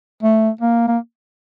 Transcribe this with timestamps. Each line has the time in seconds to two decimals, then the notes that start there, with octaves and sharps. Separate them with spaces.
0.23 A3
0.61 A#3
0.88 A#3